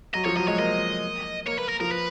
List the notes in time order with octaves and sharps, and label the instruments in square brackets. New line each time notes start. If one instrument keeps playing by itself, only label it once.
[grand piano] F#3 [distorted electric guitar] D#5
[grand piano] F3 [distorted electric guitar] C#5
[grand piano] F#3 [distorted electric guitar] D#5
[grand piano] G#3 [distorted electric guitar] C#5
[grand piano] A#3 [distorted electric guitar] D#5
[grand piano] A#3 [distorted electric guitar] C#5
[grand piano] A#3 [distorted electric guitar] B4
[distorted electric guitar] A#4
[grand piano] F3 [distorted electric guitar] A#4
[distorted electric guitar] B4